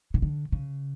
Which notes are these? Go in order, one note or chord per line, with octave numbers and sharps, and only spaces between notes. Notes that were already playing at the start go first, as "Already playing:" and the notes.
C#3
D3
C#3